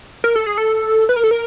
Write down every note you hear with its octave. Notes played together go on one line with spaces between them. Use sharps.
A#4
A4
G#4
A4
B4
A#4
A4
A#4